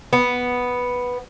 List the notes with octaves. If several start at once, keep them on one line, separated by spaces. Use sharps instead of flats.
B3